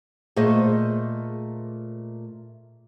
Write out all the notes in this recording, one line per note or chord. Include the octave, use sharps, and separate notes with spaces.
A#2 A3 G#4 C5 D#5